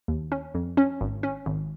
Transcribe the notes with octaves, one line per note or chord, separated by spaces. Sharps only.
D#2
C#4
F2
C#4
G#1
C#4
G#1